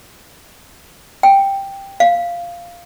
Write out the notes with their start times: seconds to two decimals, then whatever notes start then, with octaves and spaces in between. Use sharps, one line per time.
1.23 G5
2.00 F5